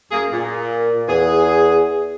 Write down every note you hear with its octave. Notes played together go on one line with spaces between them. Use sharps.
F#2 A#3 G#4
A#2 A#3
E2 G#4